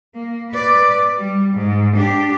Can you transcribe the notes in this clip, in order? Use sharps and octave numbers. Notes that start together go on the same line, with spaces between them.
A#3
B4 D5
G3
G#2
D4 G4